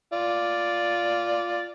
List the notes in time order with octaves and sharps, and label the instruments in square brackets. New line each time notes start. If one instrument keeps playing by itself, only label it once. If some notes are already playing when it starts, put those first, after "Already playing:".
[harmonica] F4 D5